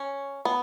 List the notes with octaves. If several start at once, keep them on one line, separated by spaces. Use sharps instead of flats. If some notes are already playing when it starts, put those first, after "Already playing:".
Already playing: C#4
B3